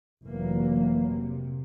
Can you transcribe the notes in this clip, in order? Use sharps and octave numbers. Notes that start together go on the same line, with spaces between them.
F1 E3 F#3 A#3
C3